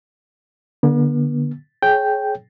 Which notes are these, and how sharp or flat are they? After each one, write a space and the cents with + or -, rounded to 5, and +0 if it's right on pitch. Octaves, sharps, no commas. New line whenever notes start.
D3 +0 B3 -45
G#4 +25 C#5 -15 G5 +0